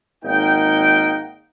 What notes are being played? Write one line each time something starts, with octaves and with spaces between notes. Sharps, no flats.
G#1 A#3 D#4 F#5 G5